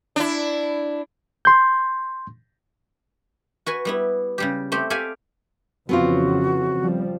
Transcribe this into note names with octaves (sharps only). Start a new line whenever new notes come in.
D4 E4
C6 G6
F#4 B4 G#5
G3 B3 E4
C#3 G3 G4
A3 C4 G4
G4 A4 D5 E5 F5 G#5
F2 C#3 E3 B3 C4 F4 F#4
F3 G3